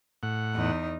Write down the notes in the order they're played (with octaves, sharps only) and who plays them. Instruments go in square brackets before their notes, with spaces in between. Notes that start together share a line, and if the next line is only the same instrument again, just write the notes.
[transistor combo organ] A2 F#5
[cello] E2 D#4